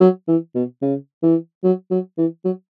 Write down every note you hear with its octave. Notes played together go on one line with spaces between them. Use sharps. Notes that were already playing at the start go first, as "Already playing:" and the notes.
F#3
E3
B2
C#3
E3
F#3
F#3
E3
F#3